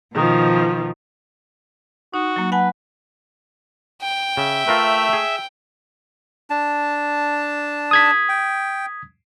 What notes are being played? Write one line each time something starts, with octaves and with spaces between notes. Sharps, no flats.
B2 D#3 F3
D#4 F#4
F#3 A#3
B4 F#5 G#5 A5
G5
C#3 E5
A3 F4 A#4 B4
G#4
D4 A5
D#6 G#6 B6
G5